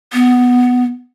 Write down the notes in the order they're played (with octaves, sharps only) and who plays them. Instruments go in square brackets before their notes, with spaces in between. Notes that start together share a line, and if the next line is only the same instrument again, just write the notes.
[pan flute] B3